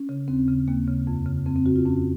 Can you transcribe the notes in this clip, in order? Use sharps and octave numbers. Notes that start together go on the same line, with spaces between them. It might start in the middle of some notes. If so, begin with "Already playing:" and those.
Already playing: C#4
C#3
D#2 C4
C#3
D#2 A#3
C#3
F2
C#3
F2 C4
C4
C#3 F#4
F4
F2 C#4